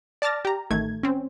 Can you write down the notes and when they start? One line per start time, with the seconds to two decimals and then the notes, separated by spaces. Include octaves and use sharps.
0.22 D5 A5 D6 F6 A6 A#6
0.45 G4 A#5
0.70 A1 D#3 A3 G#6
1.03 C4 C#4